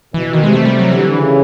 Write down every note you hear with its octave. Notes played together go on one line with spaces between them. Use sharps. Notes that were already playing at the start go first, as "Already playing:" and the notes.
B2 E3
B2
D#3
C3 G#3
A3
G3
F#3
D3 E3
D3
C#3